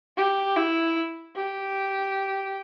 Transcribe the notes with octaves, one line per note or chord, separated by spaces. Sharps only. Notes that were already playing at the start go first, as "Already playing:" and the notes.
G4
E4
G4